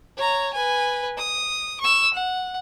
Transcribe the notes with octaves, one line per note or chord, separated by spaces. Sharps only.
C#5 A#5
B4 G#5
D#6
C#6 E6
F#5